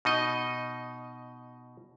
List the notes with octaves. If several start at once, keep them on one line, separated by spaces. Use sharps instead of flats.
B2 D#4 D#5